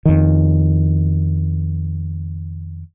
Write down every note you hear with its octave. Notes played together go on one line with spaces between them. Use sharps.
F2 D#3